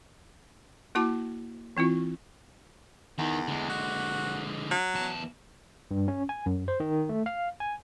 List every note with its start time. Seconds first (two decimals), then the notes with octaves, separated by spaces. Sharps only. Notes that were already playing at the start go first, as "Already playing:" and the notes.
0.95 A#3 E4 F#4 A5 D6
1.77 E3 C4 E4 F4
3.18 E2 D#3
3.48 D3 G#3
3.69 F#4
4.71 F#3
4.95 E2 A5
5.91 G2
6.08 C#4
6.29 G#5
6.46 F#2
6.68 C5
6.80 D#3
7.09 A3
7.26 F5
7.60 G#5